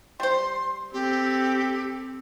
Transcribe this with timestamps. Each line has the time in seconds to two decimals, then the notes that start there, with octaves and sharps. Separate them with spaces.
0.20 G3 C5 C6
0.93 C4 G4 A4